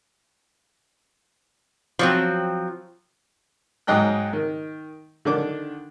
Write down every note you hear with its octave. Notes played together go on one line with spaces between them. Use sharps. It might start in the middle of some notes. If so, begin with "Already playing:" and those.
F3 F#3 C4
G#2 F#3 D#5 G5 F#6
D#3
D3 D#3 D4 D6